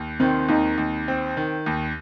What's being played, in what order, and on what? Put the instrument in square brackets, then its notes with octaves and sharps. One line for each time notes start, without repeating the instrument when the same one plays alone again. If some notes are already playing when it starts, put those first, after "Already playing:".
Already playing: [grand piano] D#2
[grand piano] D#3 [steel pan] C4
[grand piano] D#2 [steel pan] D#4
[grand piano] D#2
C4
D#3
D#2